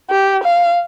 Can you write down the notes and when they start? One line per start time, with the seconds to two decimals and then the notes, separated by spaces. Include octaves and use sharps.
0.10 G4
0.44 F5